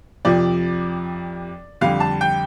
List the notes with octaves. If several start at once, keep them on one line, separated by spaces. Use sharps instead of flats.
F2 C3 F3 D5
F2 D3 G3 F5
A5
G5